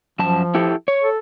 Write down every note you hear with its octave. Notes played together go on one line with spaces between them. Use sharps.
F#2 F3 A5
E4 G4 A4
C#5
A4